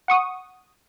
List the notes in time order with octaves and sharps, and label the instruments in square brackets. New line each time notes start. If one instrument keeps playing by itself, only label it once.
[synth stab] F#5 C#6 D#6